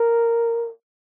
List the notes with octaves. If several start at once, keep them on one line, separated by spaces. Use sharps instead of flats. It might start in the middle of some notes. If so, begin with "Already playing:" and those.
Already playing: A#4